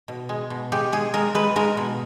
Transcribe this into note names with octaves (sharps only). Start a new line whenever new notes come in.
B2
G#3
B2
G#3 G4
G#3 G#4
G#3 A#4
G#3 B4
G#3 A#4
B2